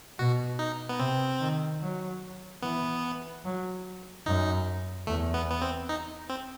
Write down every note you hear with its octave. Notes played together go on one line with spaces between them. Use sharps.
B2 F#4
D#4
B3
C3 C4
D#3
F#3
E3 B3
F#3
F#2 D#4
E2 A3
B3
B3
C4
D#4
C4